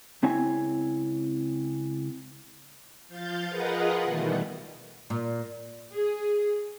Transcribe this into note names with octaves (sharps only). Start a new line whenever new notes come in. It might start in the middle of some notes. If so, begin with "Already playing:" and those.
C#2 C4 E4 C#5 G#5
F3 F5 G6 A6
F4 G#4 A#4 B4 D#5 F#5
B2 D#3 E3 G3 A3
A#2
G#4